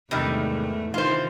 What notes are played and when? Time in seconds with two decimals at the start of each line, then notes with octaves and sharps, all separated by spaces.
0.11 E2 G#2 C3 D#3 G3 A3
0.94 C3 D#3 E3 F4 C5